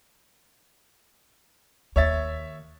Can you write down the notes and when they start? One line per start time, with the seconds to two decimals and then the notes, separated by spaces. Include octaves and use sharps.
1.96 D#2 C#5 E5 A6